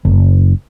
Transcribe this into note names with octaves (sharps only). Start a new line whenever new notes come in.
F#1